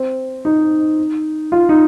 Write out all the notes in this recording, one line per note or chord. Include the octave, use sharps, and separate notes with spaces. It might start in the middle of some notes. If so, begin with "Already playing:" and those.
Already playing: C4
D#4
F4
D#4